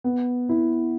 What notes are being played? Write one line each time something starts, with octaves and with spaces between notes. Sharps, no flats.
B3
E4